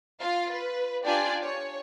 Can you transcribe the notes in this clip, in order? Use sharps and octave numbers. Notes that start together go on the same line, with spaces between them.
F4 F5
B4
D4 F4 G4 D5 G#5
C#5